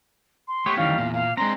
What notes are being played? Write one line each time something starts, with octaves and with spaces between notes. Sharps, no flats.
C6
A3 B3 G4 C#5
D2 D#3 E3 G3 C#4 F5
E2 A#2
A#2 F5
G#3 C4 D4 A#5 C6